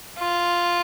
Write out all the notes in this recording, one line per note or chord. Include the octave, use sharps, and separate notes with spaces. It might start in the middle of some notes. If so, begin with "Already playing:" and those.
F4